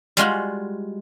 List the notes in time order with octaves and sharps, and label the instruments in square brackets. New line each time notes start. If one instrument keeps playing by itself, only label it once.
[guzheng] G3 G#3 F4 F#4